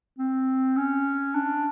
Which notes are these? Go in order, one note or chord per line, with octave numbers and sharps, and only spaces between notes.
C4
C#4
D4